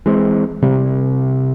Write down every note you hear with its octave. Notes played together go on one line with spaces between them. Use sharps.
E3 G#3 C4
C3 G3